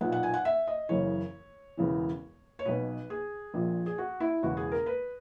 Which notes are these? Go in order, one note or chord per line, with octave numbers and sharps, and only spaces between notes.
B1 A#2 F#5
F#5
G#5
F#5
E5
D#5
F#1 F#2 C#3 E3 C#5
E1 E2 C#3 E3
C#5
B1 B2 B4
G#4
A#1 A#2
G#4
F#4
E4
E1 E2 C#3 F#4
G#4
A#4
B4